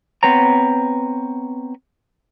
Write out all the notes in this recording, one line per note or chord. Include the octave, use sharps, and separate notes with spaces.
B3 C4 B4 C#5 A#5